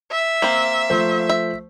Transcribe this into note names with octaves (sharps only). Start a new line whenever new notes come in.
E5
A#3 C4
F3 A3 C5
E5